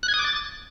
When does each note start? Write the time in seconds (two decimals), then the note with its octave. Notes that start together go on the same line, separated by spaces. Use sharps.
0.03 F#6
0.08 G#6
0.14 D#6
0.19 D6
0.24 A6